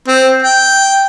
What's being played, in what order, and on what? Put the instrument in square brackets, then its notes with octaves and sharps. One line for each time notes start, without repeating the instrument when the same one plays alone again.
[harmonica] C4
G5